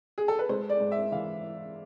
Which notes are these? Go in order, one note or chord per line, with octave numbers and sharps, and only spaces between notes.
G#4
A4
B4
G#3 C5
D5
G#2
E5
E3 F5